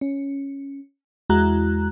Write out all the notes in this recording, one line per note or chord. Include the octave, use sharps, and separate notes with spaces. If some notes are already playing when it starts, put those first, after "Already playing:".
C#4
E2 G#3 E4 F#4 A#5 F#6